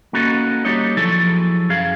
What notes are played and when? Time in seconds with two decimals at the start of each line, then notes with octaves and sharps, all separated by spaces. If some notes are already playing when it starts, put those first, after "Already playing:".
0.13 A#3 B3 C#4 D#4 F#4 A4
0.65 G3 A#3 D#4 C#5 D#5
0.97 F3 F#3 E4 G#4 A4
1.70 F#2 G#4 F5